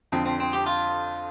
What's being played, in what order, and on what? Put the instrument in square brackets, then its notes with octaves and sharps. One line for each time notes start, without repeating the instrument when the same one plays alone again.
[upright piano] F2 D3 F3 [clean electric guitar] C4
[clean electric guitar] C4
C4
G4
F4